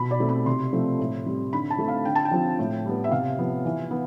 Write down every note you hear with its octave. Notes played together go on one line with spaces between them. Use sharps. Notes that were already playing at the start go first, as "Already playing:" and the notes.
Already playing: B2 B5
D5
A3 C4
B5
C3 C6
F3 A3 C4
A2
G3 C4
D3 B5
A5
A3 C4
F5
D3 G5
A5
G5
F3 C4
A2
G3 B3
E5
C3 F5
F3 B3
E3
B3